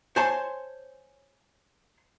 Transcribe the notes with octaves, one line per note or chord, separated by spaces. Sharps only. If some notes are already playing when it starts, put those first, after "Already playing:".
C5 C#5 G#5 A5 C6